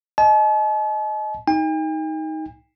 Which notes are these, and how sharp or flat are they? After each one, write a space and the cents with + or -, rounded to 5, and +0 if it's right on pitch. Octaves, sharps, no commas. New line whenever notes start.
D#5 +0 A5 -45
D#4 +15 G5 +45